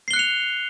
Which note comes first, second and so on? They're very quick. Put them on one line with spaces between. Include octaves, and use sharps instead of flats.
C7 G7 F#6 C#7 F7